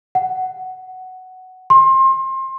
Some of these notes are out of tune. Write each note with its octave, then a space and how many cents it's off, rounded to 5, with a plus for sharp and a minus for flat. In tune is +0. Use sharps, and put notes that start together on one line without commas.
F#5 +5
C6 +30